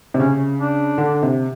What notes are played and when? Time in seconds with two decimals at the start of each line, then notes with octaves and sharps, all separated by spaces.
0.14 C3
0.19 C#3 C#4
0.59 D4
0.98 D3
1.23 C3